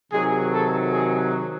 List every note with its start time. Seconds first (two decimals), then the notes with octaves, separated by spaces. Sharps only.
0.11 C3 D#3 F#3 G#4
0.53 A4
0.92 G#4